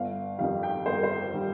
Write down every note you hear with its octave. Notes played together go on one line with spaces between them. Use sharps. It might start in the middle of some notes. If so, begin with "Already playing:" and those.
Already playing: G1 F5
F2 D#3 G3 F5
G5
G1 C5
A#4
C5
D#3 G3